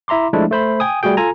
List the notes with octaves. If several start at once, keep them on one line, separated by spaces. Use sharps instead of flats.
E4 E5 A#5 C6 D6
F3 G#3 A3 D4 E4
A3 C5 B5
G5 G#5 D#6
G3 A3 F#4 G#4 G5
F4 A4 G#5 A#5